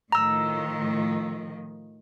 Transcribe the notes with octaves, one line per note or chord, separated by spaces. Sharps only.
A2 D#3 F3 A#5 E6